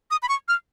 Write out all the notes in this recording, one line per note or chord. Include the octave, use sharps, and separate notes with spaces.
D#6
B5
C#6
F6